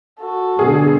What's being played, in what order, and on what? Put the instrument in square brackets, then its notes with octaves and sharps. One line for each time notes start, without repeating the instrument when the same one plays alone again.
[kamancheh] F#4 A4
[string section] B2 D3 G3 [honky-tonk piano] G#4